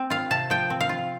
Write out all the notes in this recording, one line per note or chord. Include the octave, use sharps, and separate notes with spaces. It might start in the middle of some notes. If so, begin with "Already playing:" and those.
Already playing: C4
F4 F5
C3 A5
F3 G5
C4
F5
F4